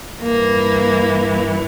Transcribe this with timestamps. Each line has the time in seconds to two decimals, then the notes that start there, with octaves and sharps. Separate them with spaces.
0.22 G2 E3 A#3